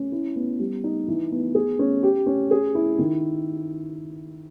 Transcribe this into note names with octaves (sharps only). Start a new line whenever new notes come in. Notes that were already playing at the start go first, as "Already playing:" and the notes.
Already playing: C#4
E4
B3
G3
D#4
E3
B3
G#4
C#4
G4
C#4
G#4
E4
D#3